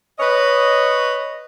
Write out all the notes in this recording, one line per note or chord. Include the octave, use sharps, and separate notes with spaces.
B4 C#5 D#5